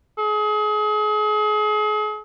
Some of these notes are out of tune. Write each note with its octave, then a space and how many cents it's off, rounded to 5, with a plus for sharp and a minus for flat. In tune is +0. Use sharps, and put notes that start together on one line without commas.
G#4 +35